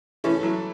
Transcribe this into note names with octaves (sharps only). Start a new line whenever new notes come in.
E3 A3 C#4 E4 A4
F#3